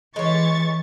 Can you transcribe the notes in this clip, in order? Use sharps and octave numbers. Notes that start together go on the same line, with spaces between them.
E3 G#3 C#5 C#6 A6